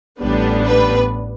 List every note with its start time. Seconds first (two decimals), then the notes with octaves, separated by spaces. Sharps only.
0.20 A1 A2 G3 B3 D4 B4
0.66 B4